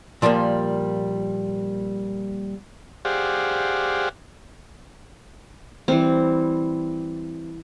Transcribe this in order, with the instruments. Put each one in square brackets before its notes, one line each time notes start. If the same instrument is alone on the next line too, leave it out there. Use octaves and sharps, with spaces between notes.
[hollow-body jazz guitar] A#2 F3 G3 A3 A#3
[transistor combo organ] G4 G#4 C5 D5 F5 F#5
[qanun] E3 G3 C4